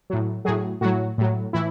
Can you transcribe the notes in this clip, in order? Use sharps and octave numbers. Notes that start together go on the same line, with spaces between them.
A2 F#3
A2 F#3 G#4
A2 F#3 F#4
A2 F#3
A2 E3 E4